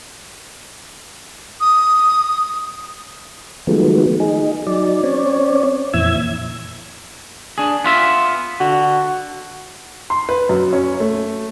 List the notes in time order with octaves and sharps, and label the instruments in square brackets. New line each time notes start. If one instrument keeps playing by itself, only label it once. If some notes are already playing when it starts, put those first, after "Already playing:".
[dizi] D#6
[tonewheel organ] D#3 F3 F#3 G#3 A3 B3
D#4 G#4
F#3 D#4 D5
C4 C#4 C#5 D5
F2 A#2 E3 E5 E6 G#6
[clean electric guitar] D4 G#4
B3 F4 E5
[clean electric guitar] D3 [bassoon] F#4
[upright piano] C6
B4
F#2
C#4
A3